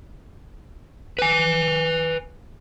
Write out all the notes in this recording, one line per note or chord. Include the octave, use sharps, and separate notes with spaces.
B4 G#5